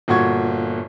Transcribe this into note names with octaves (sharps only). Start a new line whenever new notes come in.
G1 A#2 F#4 C#6 G#6